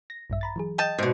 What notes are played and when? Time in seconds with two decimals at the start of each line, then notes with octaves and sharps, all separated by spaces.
0.10 A#6
0.30 A#1 G2 E5
0.41 A#5 B5 A6
0.56 E3 F#3 G#4
0.78 D#5 G5 A5
0.98 G#2 B2 D#6 C7 D7